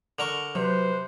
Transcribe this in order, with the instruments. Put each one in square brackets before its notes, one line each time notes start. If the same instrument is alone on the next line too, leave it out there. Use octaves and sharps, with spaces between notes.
[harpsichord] D3 A#4 C#6
[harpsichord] C3 [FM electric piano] F#3 [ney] B4 [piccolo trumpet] C5